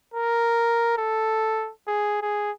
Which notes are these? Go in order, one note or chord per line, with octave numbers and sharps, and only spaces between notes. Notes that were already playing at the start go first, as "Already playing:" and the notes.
A#4
A4
G#4
G#4